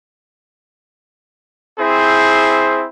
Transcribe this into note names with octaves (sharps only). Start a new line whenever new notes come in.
C4 E4 G#4 C5